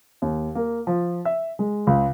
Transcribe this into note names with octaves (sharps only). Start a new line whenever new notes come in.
D#2
A#3
F3
E5
G#3
C#2